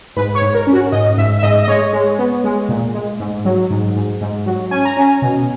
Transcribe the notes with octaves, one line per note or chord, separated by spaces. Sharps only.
G#2 B4
C#5
G#2
A#4
C#4
F#4
G#2 D#5
G#2 E5
E5
G#2 D#5
D#5
G#3 C#5
G#3
B3
G#3
A#2
G#3
G#2
F#3
G#2
G#2
G#2
F#3
C#4 G#5
A#5
C#4 G#5
B2